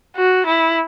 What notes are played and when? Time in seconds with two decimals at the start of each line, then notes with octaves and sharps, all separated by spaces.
0.16 F#4
0.47 E4